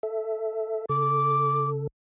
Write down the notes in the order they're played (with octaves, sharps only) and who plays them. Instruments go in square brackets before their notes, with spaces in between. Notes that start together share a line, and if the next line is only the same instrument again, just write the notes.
[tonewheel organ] A4 E5
[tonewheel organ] C#3 A4 [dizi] D6